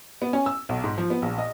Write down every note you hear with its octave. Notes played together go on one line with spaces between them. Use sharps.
B3
C#4
E6
B1
G#2
F3
B3
A#1
D#5